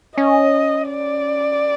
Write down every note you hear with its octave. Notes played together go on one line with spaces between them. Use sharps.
C#4 D#5
D5